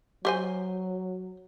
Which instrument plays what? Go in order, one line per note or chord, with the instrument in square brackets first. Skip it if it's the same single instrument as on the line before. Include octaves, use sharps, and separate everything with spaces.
[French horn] F#3 [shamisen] G4 C5 G#5